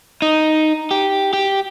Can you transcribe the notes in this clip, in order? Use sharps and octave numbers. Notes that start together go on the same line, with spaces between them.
D#4
G4
G4